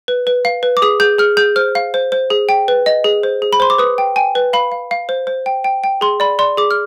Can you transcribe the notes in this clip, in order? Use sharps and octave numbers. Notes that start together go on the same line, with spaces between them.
B4
B4
F5
B4
D6
G#4 D#6
G#4 G6
G#4 F6
G#4 G6
C5 F6
F5
C5
C5
G#4
G5
B4
D#5
G#4
C5
G#4
B5
C5 C6
D6
B4 D#6
G5
G5 G#5
B4
F5 B5
F5
F5
C5
C5
G5
G5
G5
G#4 C6
D5 B5
D5 C6
G#4 D6
F6